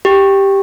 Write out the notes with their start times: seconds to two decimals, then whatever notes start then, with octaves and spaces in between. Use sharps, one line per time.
0.05 G4